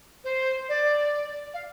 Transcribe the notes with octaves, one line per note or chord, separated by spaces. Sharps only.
C5
D5
F5